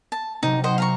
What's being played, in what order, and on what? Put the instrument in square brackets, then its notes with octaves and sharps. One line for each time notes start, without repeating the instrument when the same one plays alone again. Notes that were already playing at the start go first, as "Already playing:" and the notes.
[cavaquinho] A5
[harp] C3 F#3 [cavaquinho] D#4
[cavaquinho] C5 D#5 F#5
F5 A#5 C#6